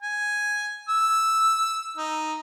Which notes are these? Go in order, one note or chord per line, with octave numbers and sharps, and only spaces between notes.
G#5
E6
D#4